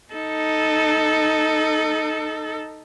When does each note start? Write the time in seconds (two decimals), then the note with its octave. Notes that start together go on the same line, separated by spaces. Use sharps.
0.13 D#4 A4